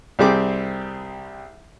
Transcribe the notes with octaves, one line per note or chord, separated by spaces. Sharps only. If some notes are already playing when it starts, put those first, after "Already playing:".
C2 G3 C4 G4 G#4 D6